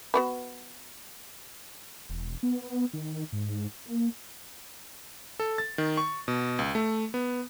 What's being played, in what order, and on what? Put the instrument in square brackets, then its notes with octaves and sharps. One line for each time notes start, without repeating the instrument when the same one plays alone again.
[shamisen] B3 F#4 B4
[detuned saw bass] E1
B3
D#3
G#2
A#3
[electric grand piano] A4
A6
D#3
C#6
B2
C#2
A3
B3